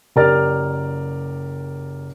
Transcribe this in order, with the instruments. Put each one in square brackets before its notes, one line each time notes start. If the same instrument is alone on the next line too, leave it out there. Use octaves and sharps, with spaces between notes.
[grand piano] F#1 G4 A#4 D5 F6 A6